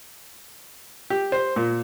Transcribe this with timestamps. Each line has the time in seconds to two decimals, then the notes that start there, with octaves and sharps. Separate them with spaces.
1.10 G4
1.32 C5
1.56 A#2